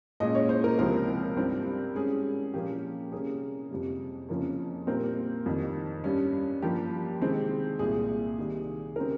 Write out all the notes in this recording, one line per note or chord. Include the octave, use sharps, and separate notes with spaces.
A#2 G#3 C#4 D#5
C#5
C5
A#4
C#2 C3 F3 C4 A#4
G2 G3 C4
G#2 G3 C#4 G#4
A#2 F3 A#3 C#4 G4
C3 G3 A#3 C#4 G#4
F2 C3 G3
F2 C#3 F3 A#3 C#4
A#2 G3 C4 A#4
F2 D#3 G3
G2 G3 C#4
G2 F3 A#3 G4
C3 D#3 G#3 C4
C2 A#2 G3 G#4
C3 D#3 G3
C#3 G3 C4 A#4